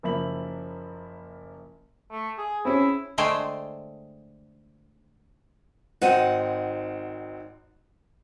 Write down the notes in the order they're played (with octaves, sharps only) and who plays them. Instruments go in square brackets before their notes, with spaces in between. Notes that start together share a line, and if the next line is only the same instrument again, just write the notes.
[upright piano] F#1 F3 A#3 E5 B5 F#7
[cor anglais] A3
G#4
[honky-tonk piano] C4 C#4 G#4 [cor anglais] E4
[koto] D3 G#3 A3 C5 G5 G#5
[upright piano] G#1 C4 D#7 [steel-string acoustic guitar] D#4 F#5